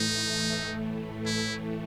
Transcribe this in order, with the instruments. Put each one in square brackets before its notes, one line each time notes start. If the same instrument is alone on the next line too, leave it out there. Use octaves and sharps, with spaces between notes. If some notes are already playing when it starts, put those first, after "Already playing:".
Already playing: [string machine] A2 E3 A3 [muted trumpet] D#4
[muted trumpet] E4